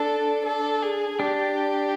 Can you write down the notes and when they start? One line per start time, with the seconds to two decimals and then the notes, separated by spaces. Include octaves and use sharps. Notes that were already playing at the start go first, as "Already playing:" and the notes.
Already playing: D4 A4
0.46 A4
0.83 G#4
1.19 D4 G4